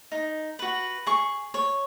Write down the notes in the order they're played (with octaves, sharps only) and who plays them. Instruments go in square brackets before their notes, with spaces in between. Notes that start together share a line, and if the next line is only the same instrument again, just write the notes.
[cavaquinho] D#4
F#4 B4
G#4 C#6
C#5